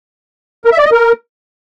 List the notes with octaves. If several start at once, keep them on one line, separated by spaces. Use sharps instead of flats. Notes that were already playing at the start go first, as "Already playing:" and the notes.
A#4
E5
D5
D#5
A#4